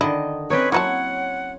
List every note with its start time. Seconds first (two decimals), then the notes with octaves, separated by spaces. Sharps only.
0.01 D3 D#3 E4 D#5
0.50 C4 C#4 D#4 B4 C#5
0.72 F#3 A#3 E4 B4 C#5 F#5 A5